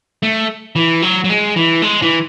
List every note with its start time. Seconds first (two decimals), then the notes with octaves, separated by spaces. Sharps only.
0.23 A3
0.76 E3
1.02 F#3
1.24 F#3
1.29 G#3
1.56 E3
1.82 G#3
2.02 E3